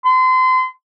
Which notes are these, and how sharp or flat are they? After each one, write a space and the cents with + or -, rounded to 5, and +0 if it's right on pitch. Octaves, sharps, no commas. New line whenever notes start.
C6 -30